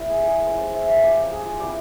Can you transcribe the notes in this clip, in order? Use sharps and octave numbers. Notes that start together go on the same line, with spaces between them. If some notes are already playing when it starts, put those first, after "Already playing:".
Already playing: G3 A#3 E4
G#4
G#4
G#3 C#4 F4 C5
C5
E5
F5
F3 A#3 C#4 F4 G4
G#4
F4
G3 C4 E4 G4